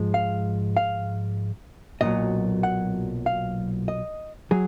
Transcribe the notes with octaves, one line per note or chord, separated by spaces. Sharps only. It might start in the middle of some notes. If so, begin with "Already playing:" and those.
Already playing: G#2 F3 G#3
F5
F5
B1 A#2 F#3 D#5
F#5
F5
D#5
F#3 G#4